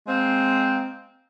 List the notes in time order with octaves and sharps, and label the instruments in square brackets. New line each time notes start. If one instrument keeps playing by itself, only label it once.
[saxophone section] G#3 A#3 C4